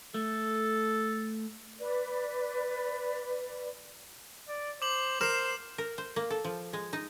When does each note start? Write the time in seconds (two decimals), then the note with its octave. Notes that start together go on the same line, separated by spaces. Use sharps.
0.14 A3 A4
1.80 B4 D5
4.48 D5
4.82 C5 D6 F#7
5.21 A#4 C5 C7 E7
5.78 A#4
5.98 C5
6.16 A#3
6.30 A4
6.45 F3
6.73 G#3
6.93 D#4